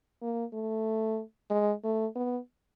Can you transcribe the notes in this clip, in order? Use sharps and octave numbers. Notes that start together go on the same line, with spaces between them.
A#3
A3
G#3
A3
B3